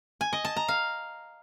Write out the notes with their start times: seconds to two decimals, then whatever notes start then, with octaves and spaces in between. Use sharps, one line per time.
0.21 G#5
0.33 D#5
0.45 A5
0.56 A#5
0.68 F5